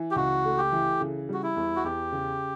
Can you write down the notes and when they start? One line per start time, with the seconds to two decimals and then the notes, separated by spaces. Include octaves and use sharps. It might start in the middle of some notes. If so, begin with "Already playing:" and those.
Already playing: E3
0.11 G4
0.16 C#2 F#4
0.45 A3
0.58 G4
0.72 E3
1.01 C#3
1.29 G3 F#4
1.43 E4
1.56 E2
1.76 F#4
1.84 E2 G4
2.12 C#3